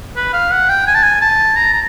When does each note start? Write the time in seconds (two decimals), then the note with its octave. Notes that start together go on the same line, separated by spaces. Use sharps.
0.17 B4
0.33 F5
0.52 F#5
0.69 G5
0.87 G#5
0.95 A5
1.03 G#5
1.22 A5
1.57 A#5
1.73 A#5